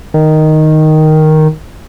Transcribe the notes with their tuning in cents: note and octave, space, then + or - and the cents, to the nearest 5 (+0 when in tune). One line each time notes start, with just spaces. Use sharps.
D#3 +0